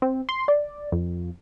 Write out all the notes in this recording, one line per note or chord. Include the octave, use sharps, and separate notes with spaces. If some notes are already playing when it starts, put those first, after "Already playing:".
C4
C6
D5
F2